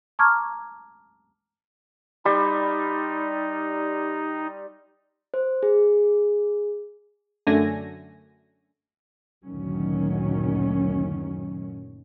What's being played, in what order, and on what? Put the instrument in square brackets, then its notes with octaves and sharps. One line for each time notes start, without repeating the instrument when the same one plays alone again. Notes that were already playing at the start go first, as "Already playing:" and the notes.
[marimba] A5 A#5 C#6 D6 F6 G#6
[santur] G3 C6 [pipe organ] D#4
[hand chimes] C5
G#4
[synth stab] F#2 D3 A3 G#5 A#6
[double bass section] F#1 D2 A#2 D#3 F#3 C#4